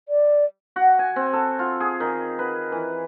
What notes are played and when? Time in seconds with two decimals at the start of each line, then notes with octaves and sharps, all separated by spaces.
0.09 D5
0.76 F#4
0.99 G#5
1.16 C4
1.33 A4
1.59 F4
1.80 G#4
2.00 D#3
2.39 B4
2.72 E3